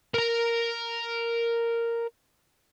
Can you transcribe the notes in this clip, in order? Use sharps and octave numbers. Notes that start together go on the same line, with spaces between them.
A#4 A#5